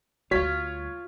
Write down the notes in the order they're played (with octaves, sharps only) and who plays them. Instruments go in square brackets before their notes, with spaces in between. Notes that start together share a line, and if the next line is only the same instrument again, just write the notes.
[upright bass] D2 G3 [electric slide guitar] F4 F5 [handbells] F#4 [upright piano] C#5 B6